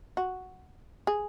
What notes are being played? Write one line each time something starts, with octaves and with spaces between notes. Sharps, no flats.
F#4
G#4